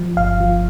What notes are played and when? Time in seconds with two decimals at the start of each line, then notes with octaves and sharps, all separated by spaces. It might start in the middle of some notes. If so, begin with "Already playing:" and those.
Already playing: F3
0.17 G1 F5
0.40 F3